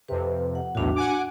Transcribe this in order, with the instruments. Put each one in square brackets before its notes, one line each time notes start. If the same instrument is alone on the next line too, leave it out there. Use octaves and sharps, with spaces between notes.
[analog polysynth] F2 C3 [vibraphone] B4
[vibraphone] F#5
[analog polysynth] B1 E2 A2 [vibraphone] D4 F#4
[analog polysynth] F#5 G#5 D6